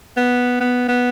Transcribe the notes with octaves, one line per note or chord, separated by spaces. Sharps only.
B3
B3
B3